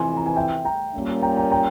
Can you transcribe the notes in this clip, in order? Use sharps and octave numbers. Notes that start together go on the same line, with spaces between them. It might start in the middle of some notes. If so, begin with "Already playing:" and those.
Already playing: F2 C3 E3 G#5 C6
A#5
G#5
E5 G5
G5 A#5
A#2 G3 A#3 C#4
G5 A#5
G5 A#5
G5 A#5